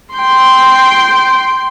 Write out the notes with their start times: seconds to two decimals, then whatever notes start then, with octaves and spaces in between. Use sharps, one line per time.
0.14 G5 C6